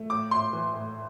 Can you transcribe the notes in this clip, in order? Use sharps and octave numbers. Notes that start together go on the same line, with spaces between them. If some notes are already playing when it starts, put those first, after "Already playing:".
Already playing: A3
A2 D6
A2 C6
E3
A2